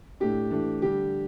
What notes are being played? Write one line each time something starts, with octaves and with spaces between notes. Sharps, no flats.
A2 A3 D4 G4
E3 A3 D4
D3 G3 D4 G4